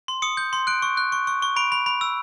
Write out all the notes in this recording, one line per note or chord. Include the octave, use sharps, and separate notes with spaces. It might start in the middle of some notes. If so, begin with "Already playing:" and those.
C6
D#6 C#7
G6
C6
F#6 D7
C#6
F#6
C#6
C#6
C#6
B5 D7
B5
B5
E6